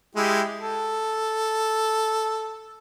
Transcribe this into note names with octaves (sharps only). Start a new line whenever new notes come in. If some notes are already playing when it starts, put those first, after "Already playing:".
G#3 E4 G4
A4